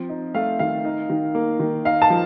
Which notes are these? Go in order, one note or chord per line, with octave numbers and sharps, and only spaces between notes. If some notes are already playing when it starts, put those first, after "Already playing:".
Already playing: F3 C4
D#4
A3 F5
D#3 F5
D#4
D#3
A#3
D#3
D#4 F5
A5
F3